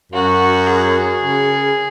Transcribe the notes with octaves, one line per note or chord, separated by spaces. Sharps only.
F#2 F#4
G#4
C#3